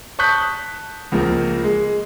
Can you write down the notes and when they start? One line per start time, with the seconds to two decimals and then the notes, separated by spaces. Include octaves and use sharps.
0.19 A5 C#6 D#6 F#6 G6 B6
1.12 C#2 F3 A#3
1.64 G#3